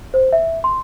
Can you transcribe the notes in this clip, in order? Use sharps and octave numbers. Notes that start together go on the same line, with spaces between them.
C5
E5
C6